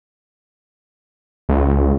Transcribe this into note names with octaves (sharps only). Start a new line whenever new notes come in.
C#2